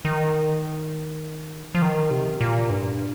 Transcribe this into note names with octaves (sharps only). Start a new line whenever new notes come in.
D#3
F3
D#3
C3
A#2
G2